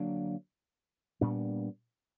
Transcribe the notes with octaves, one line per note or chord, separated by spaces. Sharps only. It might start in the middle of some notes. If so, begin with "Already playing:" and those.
Already playing: D3 F#3 A#3 D4
A#2 G3 B3 D4